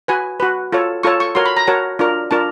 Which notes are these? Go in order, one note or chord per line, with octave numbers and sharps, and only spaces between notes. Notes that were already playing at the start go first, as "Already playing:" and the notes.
F#4 B4 G#5
F#4 B4
F4 A4 C#5
F4 A4 C#5 C#6
C#6
F#4 A#4 C#5 C6
B5
A#5
F#4 A#4 C#5 A5
D4 F4 A#4
D4 F4 A#4 A5